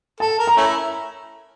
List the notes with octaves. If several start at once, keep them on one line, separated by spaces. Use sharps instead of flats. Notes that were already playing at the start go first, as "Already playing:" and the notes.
A4 A5
A#4
A#5
A3 C#4 E4